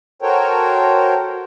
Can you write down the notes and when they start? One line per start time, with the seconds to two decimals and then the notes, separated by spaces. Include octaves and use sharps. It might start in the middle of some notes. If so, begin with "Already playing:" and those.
0.22 F#4 A4 A#4 C5 C#5 G5